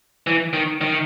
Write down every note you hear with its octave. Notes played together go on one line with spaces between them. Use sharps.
E3
D#3
D#3